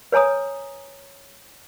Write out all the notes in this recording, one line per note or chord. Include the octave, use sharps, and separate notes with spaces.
B4 C#5 G#5 A#5 D#6